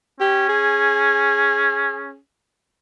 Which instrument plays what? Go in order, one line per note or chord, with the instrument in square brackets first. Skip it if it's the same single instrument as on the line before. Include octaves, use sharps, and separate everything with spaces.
[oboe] C#4 [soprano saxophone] G4
[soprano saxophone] G#4